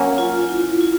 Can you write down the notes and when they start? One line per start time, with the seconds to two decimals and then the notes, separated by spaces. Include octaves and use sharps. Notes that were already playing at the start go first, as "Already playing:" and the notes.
Already playing: F#3 A#3 C#4 F#4 A#4
0.18 F4
0.49 E4
0.81 F4